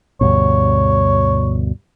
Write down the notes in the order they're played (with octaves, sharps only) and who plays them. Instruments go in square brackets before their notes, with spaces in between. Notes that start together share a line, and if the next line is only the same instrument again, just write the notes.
[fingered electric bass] D2 G2 B2 [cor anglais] C#5